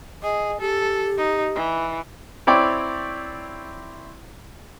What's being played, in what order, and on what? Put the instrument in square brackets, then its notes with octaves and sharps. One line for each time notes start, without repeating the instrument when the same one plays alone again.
[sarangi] G#4 [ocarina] D#5
[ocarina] G4 [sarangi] A4
[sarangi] D#4
E3
[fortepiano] C4 E4 C#5 D5 G5